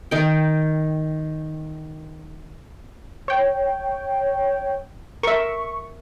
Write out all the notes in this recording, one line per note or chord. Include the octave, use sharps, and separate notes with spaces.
D#3 G5
C#5 G5
A#4 E5 C#6